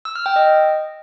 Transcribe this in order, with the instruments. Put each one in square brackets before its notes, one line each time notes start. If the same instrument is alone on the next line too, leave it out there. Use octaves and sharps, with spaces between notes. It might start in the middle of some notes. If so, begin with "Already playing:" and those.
[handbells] E6
F6
G5
D#5